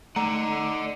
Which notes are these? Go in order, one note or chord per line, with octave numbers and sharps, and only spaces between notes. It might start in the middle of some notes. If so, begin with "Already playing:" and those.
A3 D#4 D5 F#5 A#5